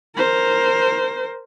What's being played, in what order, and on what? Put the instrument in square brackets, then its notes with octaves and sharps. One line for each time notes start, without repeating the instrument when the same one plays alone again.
[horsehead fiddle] A#4 C5